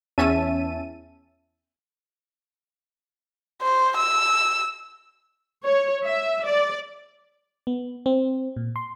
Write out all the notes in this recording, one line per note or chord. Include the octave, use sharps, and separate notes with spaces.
E2 C#4 E5 A5 D#7
C5
E6
C#5
E5
D5
B3
C4
A#2
C6